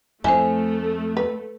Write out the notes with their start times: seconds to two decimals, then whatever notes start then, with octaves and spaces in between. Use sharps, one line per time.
0.24 F2 A3 E4 C5 G#5
1.17 B4